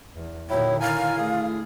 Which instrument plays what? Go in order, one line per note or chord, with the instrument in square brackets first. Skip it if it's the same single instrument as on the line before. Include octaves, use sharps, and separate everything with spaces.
[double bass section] E2
[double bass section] A#2 D3 D#3 [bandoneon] F#3 E4 [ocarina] C#5 [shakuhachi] G5
[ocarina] E4 [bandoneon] A#4 G#5 [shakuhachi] F5
[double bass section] D3 A3 [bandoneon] G#4